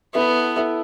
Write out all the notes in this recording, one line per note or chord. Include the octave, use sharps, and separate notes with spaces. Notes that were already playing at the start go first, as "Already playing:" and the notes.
B3 E4 A4 E5
E4 A4 E5